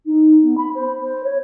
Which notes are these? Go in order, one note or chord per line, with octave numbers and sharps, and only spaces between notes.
D#4
B3
B5
C5
C5
C#5